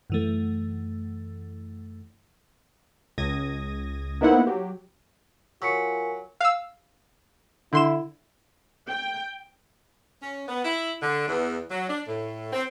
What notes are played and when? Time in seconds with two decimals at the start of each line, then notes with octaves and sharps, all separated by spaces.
0.10 F#2 E3 A3
3.18 C#2 D#6 G#6 A#6 D#7
4.21 A#3 B3 D#4 E4 C5 F#5
4.47 F#3 G4
5.62 F#3 F4 A#4 G#5 C#6 B6 C#7
6.40 F5 E6
7.73 D3 E4 C6 E7
8.88 G5
10.21 C#4
10.47 B3
10.64 E4
11.01 D3
11.28 E2
11.69 F#3
11.89 D4
12.08 A2
12.52 C4